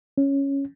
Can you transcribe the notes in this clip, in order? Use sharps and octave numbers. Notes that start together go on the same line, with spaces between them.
C#4